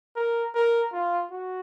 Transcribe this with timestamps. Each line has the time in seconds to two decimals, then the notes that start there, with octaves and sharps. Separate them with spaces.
0.16 A#4
0.55 A#4
0.92 F4
1.31 F#4